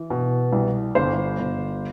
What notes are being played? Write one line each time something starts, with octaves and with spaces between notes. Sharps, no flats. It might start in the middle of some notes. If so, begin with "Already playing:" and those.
Already playing: E3
B2
C2
G1 C5
G1